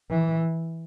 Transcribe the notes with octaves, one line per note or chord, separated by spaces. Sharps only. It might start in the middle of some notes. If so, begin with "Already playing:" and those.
E3